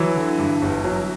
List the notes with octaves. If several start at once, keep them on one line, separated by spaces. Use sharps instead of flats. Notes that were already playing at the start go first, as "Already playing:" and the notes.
Already playing: E3 F#3
D3
G2
G1
F#3